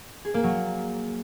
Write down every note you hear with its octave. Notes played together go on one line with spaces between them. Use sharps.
G#4
A#3
F#3